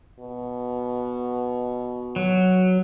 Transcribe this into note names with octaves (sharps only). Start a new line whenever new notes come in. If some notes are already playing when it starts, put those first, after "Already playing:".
B2
F#3